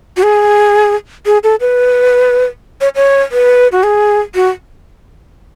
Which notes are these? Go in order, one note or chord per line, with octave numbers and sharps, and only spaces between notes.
F#4
G#4
G#4
A4
B4
C#5
C#5
B4
F#4
G#4
F#4